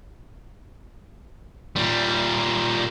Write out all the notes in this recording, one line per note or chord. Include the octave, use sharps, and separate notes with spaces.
A#2 G3